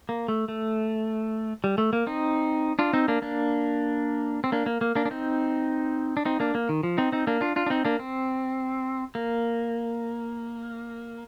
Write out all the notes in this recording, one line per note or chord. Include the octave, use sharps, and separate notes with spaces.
A#3
A3
A3
G3
A3
A#3
C4 D#4
D4 F4
C4 D#4
A#3 D4
A#3 D4
C4
A#3 D4
A#3
A#3
A#3 D4
D4
C4 D#4
D4
C4 D#4
A#3 D4
A#3
D#3
F3
C4 D#4
C4 D#4
A#3 D4
D4 F4
D4 F4
D4
C4 D#4
A#3 D4
C4
A#3